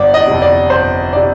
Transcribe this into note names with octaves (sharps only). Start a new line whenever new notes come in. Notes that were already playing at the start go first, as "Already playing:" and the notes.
Already playing: G1 D5
D#5
F2 C3
D5
G1 C5
C3 D5